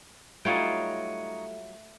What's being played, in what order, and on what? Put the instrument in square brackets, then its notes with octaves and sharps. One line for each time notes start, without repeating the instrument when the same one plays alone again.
[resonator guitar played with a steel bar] F#3 G3 F4 [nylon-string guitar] A3 [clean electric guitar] D#4 C#5 G5